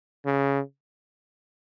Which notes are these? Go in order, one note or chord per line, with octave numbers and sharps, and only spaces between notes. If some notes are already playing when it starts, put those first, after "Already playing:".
C#3